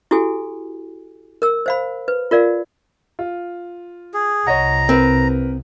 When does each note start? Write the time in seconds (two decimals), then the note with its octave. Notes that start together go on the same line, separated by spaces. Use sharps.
0.11 E4 F#4 G4 A4 G#5
1.42 A#4 E6
1.66 C5 F5 B5
2.08 B4
2.31 F4 A#4 D5 F5
3.19 F4
4.14 G#4
4.47 C2 C#5 D#5 F#5 A#5
4.89 C4 A#4 B4